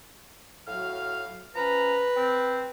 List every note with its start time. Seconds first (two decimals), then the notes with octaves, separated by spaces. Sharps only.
0.67 A2 F#3 F5 F6
1.55 F3 C#4 B4 A#5
2.16 C4